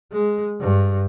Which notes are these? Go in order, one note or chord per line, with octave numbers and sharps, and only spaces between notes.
G#3
G2